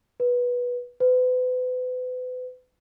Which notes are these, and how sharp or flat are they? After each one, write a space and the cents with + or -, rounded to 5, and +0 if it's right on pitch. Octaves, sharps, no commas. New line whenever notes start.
B4 -15
B4 +35